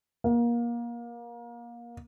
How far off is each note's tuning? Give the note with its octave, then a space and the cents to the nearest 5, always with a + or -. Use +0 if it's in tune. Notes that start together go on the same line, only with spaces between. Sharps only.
A#3 +25